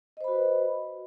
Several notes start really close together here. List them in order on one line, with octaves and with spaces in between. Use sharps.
D#5 C5 B5 F#4 B4